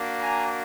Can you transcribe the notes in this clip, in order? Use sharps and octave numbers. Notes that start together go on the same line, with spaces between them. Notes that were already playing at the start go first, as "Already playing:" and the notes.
Already playing: A#3 D4 F#4
G#5 A#5